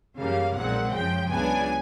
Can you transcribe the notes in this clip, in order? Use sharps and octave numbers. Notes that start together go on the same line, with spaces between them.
F#2 C#3 E3 G3 A#3 F5
B1 A#2 F3 G#3 C4 F#5
F#2 C#3 F3 G5
C#2 C#3 F#3 B3 D4 G#5